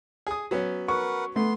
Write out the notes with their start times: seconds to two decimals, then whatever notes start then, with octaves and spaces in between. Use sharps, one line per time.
0.27 G#4 D#6
0.51 F#3 B3 C#4
0.88 A#4 B4 F#5 C#6
1.36 A3 B3 C6